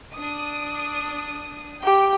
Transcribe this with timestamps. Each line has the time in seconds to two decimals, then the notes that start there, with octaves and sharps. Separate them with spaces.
0.14 D4 D#6
1.84 G4 G5